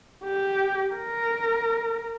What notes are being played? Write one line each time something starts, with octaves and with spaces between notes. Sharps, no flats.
G4
A#4